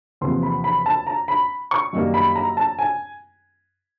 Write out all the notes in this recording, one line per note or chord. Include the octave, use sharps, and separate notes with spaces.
E2 C3 F3 A#3 C6
B5
B5
A5
A#5
B5
C#6
F#2 D#3 G3 A#3
B5
A#5
A5
G#5